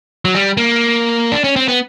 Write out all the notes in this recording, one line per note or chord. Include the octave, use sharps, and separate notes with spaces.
F#3
G3
A#3
D4
C#4
C4
B3